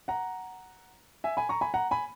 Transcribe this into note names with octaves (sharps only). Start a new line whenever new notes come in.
F#5 A#5
E5 G#5
G#5 B5
A#5 C#6
G#5 B5
F#5 A#5
G#5 B5